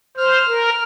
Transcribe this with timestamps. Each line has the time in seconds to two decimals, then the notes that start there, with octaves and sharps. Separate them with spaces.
0.17 C5 F6
0.48 A#4